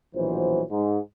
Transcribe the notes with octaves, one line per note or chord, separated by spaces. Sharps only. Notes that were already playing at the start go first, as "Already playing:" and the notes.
A#1 B2 E3 F#3 C5
G#2